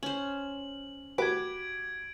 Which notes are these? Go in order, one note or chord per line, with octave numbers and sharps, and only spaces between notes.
C#4 C5 F#7
F#4 G4 B4 D6 G#6 D7